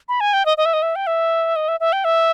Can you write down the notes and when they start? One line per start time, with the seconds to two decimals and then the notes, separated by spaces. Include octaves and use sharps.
0.09 B5
0.20 G#5
0.33 G5
0.46 D#5
0.58 D#5
0.65 E5
0.73 D#5
0.82 E5
0.96 G5
1.07 E5
1.56 D#5
1.68 E5
1.80 E5
1.93 G5
2.04 E5